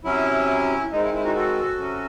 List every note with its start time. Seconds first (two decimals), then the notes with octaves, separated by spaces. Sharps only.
0.04 C3 F#3 C#4 E4
0.92 D#3 G#3 C4 D#4
1.02 E4
1.14 E4
1.24 D#4 F#4
1.35 F#4 A4
1.79 C3 F#3 C#4